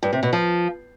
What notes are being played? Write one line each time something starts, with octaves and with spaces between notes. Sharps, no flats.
G2
C3
B2
F3